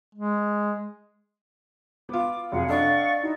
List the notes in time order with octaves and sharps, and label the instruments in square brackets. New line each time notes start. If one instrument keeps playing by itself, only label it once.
[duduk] G#3
[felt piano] B3 F4 [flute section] D6
[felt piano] F1 F#2 [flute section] F4 G#4 F#5 [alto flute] F5
[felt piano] D4 A4 D#5 [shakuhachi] D5 [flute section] F#5 C#6
[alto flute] D#4 [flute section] E4 F#4